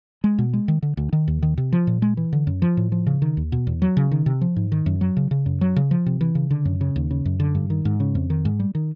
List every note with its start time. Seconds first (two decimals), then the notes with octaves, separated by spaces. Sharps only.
0.24 G#3
0.38 B2
0.53 G#3
0.68 D#3
0.82 D3
0.97 D2
1.13 D#3
1.28 D#2
1.42 D#3
1.58 C3
1.73 F3
1.87 A#2
2.02 G#3
2.17 E3
2.33 D3
2.47 F#2
2.62 F3
2.77 A2
2.92 F3
3.07 C#3
3.22 D#3
3.37 D#2
3.52 B2
3.67 E2
3.82 F#3
3.97 C#3
4.11 D#3
4.26 C3
4.41 F3
4.56 G#2
4.72 D#3
4.86 F#2
5.01 F#3
5.17 C#3
5.31 C#3
5.46 F#2
5.61 F#3
5.76 C#3
5.91 F3
6.06 C3
6.21 E3
6.35 C#3
6.51 D3
6.65 F#2
6.81 C#3
6.96 D#2
7.11 C#3
7.25 F#2
7.40 D3
7.55 G2
7.70 D#3
7.85 G#2
8.00 C#3
8.15 F2
8.30 D#3
8.45 G#2
8.60 G3
8.75 D#3